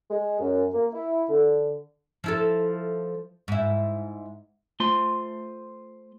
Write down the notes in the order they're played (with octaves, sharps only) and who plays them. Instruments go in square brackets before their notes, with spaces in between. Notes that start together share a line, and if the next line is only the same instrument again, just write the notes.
[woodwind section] G#3
F#2
A#3
E4
D3
[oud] F3 E4 A4
G#2 E4
[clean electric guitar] A3 F4 C5 C6